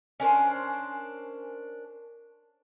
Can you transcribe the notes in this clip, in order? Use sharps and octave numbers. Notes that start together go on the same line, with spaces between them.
C#4 D4 A#4 C5